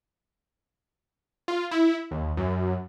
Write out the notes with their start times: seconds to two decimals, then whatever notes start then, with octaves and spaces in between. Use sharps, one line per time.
1.48 F4
1.71 E4
2.11 D#2
2.37 F#2